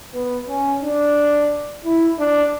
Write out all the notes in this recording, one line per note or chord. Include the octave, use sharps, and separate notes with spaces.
B3
C#4
D4
E4
D4